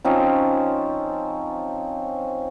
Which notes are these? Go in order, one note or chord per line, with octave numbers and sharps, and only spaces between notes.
F3 C4 C#4 D#4